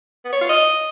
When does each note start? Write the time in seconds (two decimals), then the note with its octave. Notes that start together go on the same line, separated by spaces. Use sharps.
0.24 B3
0.33 C#5
0.41 F4
0.49 D#5